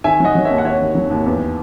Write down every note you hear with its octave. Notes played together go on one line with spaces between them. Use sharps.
D#3 E5 G#5
F#3 D#5 F#5
F#3
C#5 E5
D#2
F#5
D#3 C#5 E5
D#2
F#3
D#2
E2